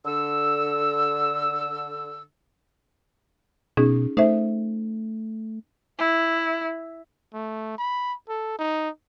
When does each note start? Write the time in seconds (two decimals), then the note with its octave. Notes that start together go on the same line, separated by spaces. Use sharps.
0.05 D3 E6
3.77 B2 C#4 D#4 G#4
4.17 A3 D#4 C5 E5
5.98 E4
7.34 A3
7.78 B5
8.29 A4
8.59 D#4